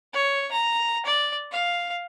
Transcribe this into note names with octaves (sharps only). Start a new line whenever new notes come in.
C#5
A#5
D5
F5